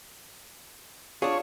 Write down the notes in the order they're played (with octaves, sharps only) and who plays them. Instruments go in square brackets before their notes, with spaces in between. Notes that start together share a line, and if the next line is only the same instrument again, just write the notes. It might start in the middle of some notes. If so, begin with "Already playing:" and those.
[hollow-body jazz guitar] D4 G#4 [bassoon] F4 [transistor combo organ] C#5